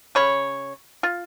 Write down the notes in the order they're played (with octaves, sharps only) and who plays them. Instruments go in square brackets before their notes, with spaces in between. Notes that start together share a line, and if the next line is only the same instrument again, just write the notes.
[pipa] C#3 C#5 B5
F4